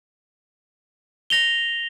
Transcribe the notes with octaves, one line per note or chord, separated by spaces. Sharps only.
A#6 F7 G7